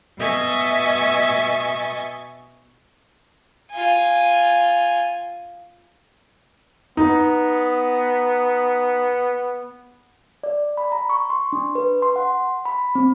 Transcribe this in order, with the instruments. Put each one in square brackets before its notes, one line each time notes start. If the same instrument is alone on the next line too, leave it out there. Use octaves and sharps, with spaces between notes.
[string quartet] B2 D#5 E5 G#5 C#6 A6
[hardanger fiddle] F4 G#5
[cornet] B3 [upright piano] D#4
[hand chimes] D5
B5
A#5
C#6
C6
D4
B4
C6
F#5
B5
C4